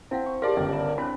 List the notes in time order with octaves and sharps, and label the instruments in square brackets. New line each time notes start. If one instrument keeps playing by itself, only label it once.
[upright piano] C4 [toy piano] E4 F5 F#5
[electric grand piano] C#6
[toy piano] G4 G#4 F5 [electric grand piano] A#4 D5 A5 [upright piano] C6
[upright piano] G1 C#2
[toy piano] E5 B5
[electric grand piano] C4 D4 [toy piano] E4 C5 C#5 [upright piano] B5